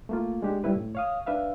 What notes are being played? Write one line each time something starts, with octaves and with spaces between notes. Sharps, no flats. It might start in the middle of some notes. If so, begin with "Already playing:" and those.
A3 A#3 F4
G#3 D4 G4
G3 C#4 E4 B4
A2
C#5 F5 D#6
D4 B4 E5 F5